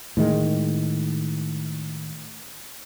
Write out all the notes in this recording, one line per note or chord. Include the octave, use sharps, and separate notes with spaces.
A2 D#3 G#3